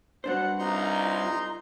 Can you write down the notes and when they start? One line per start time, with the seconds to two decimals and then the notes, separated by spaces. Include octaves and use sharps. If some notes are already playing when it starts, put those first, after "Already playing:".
0.24 G2 D4 F#4 C5 F#5
0.59 C2 D#4 F4 A#5 C6